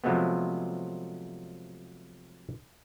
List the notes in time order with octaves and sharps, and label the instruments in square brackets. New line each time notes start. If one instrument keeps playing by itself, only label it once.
[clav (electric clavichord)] C3 F3 F#3 G#3 A3 B3